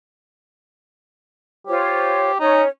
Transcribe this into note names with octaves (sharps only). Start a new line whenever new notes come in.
F4 G4 C5 C#5
C#4 D#4 C#5